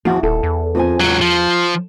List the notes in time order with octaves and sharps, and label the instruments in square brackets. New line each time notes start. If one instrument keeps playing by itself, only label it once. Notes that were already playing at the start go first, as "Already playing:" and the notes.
[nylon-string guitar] E2 F#4 [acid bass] F3
[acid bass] D#1 [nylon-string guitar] A4
[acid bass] E2
[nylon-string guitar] F2 C5 G#5
[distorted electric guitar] C#2 F#3 [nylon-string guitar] F4
[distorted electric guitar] F3